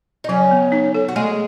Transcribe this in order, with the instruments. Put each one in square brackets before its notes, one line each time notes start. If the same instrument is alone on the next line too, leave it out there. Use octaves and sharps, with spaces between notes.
[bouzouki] D#4
[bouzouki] C#3 C#4 [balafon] F#3
[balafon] B3
D#4
A4
[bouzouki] F#4
[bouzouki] G#3 G#4 [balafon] A3